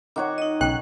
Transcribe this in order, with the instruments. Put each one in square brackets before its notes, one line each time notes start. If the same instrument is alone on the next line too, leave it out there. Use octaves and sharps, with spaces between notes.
[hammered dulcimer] D#3 F#4 C#5 [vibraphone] D6
[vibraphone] D#4 D#5
[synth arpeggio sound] B1 C#3 F#6 [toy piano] G5